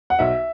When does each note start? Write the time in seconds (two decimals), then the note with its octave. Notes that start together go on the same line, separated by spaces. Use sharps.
0.10 F#5
0.19 B1 E5